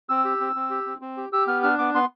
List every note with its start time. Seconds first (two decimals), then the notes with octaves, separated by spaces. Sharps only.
0.09 C4 E6
0.25 G4
0.40 C4
0.56 C4
0.70 G4
0.86 C4
1.01 C4
1.17 G4
1.33 G4 E6
1.47 B3 F6
1.63 D4 F6
1.78 B3 D6
1.95 B3 C6